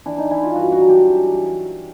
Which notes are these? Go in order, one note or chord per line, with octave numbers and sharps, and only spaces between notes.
E3 D4
D#4
E3 E4
F4
G2 F#4
F#4
F#3
G4
E3